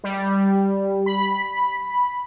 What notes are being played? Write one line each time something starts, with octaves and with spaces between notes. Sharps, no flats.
G3
B5